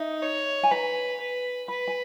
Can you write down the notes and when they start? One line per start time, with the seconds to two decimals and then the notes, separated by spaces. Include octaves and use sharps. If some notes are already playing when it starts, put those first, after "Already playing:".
Already playing: D#4 E5
0.22 C#5
0.63 G#5
0.71 B4 A#5
1.20 B4
1.68 B4 B5
1.88 G#5